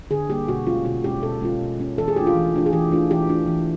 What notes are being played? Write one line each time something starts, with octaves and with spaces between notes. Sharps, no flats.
D3 G#4
G3 A#3 G4
B2 F#4
G#3 C#4 F4
B2 F#4
G#3 C#4 F4 G4
B2 A4
G#3 C#4 F4
B2
G#3 C#4 F4
E3 A4
G#4
A3 D4 F4 G4
F4
E3
A3 D4 F4
G#4
E3 G4
A3 D4 F4
E3 G4
A3 D4 F4
E3